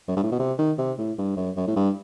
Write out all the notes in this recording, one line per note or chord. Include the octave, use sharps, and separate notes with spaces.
F#2
G2
A2
B2
C3
D#3
C3
A2
G2
F#2
F#2
A2
G2